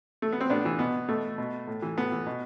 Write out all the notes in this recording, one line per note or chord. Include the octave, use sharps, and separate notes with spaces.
A3
B3
C4
A2 B3 D4
E3
B2 B3
B2 A3
B2
A2
E3
A2 B3
E3
B2